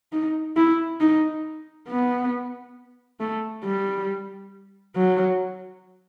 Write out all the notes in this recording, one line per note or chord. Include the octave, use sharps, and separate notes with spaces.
D#4
E4
D#4
B3
A3
G3
F#3